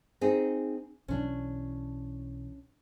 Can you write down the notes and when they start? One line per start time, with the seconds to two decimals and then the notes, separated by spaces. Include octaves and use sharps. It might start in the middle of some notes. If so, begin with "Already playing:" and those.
0.21 C4 D#4 G#4
1.08 B1 E3 F#3 C#4 D4